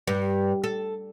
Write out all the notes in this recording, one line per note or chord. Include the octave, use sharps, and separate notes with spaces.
G2
A4